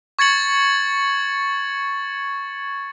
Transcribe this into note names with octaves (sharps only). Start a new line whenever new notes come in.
C#6 G#6 A6 C#7 F#7